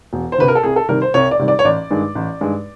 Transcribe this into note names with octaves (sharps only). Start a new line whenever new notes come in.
E1
C5
D2 C3 B4
A#4
A4
C2 G#4
A4
C3 D#3 G3 A#4
C5
C2 C#5
D5
C3 D#3 G3
D5
C#5
A1 D5
G2 D#3 G#3
A1
G2 D#3 G#3